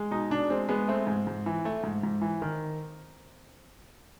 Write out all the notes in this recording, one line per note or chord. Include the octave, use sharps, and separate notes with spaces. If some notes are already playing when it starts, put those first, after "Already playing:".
Already playing: G#3
B2 D#4
B2 D4
G#3 C4
G#3 B3
A3 C4
G#2
G#2
E3
A3
G#2
G#2
E3
D#3